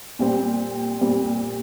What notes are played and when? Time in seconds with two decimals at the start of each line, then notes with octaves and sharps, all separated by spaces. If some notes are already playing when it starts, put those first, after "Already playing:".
0.19 A#2 G3 C4
1.01 A#2 G3 C4